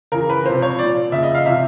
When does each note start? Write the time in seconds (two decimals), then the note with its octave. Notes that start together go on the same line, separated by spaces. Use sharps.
0.12 C#3 E3 A#4
0.30 B4
0.46 C3 F3 C5
0.62 C#5
0.79 A#2 F3 D5
1.12 C#3 F3 E5
1.23 D#5
1.34 F5
1.45 C3 E3 E5